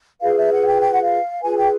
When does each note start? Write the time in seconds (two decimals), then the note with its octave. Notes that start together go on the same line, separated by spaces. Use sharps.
0.22 F4 G#4 B4 F5
0.37 E5
0.52 F#5
0.66 G5
0.81 G5
0.92 F#5
1.02 F5
1.42 F4 G#4 B4 G#5
1.57 G5